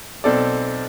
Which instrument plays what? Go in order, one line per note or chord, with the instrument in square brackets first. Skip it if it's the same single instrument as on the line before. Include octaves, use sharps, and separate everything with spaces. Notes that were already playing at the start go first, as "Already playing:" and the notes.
[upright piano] B1 C4 A4 D5